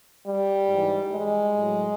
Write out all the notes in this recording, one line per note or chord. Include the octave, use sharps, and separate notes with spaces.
G3
G#2 E3
G#3
A2 F#3